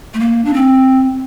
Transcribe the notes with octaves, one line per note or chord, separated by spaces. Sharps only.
A3
A#3
D4
C4